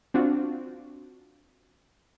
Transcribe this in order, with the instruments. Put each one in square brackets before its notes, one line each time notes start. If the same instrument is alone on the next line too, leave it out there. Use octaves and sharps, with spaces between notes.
[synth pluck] C4 D4 F4 F#4